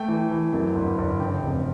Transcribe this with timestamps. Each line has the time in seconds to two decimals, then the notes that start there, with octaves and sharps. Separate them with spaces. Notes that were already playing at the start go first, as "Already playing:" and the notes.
Already playing: A3 G5
0.08 E3
0.31 E3
0.53 F#2
0.75 G1
0.98 G1
1.20 C#3 G5
1.43 F1